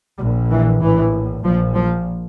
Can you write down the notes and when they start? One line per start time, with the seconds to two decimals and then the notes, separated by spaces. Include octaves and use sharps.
0.19 A#1 A#2 G3
0.50 E3
0.81 A#1 A2 E3
1.43 A#1 A#2 F3
1.74 F3